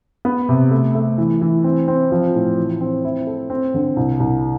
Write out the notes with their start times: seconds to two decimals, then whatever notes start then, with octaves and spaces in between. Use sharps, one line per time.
0.25 B3
0.49 C3
0.71 A3
0.95 A3
1.18 E3
1.41 E3
1.64 C4
1.88 C4
2.12 F3
2.35 A2
2.58 E3
2.81 C4
3.05 E4
3.27 A4
3.50 C4
3.74 D3
3.96 C2
4.20 C2